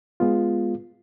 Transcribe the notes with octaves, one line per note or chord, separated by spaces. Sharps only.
G#3 B3 F4